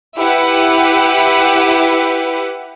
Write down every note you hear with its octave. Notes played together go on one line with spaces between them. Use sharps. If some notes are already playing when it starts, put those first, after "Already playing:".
E4 G4 B4 F#5